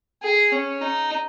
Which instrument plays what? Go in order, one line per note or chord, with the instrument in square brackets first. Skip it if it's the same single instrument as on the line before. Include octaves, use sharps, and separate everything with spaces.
[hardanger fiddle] G#4
C#4
D#4